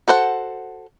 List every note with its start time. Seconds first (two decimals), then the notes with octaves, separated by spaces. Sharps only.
0.08 F#4 A4 C5 F#5